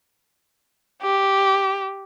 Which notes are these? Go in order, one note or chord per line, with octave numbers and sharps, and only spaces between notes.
G4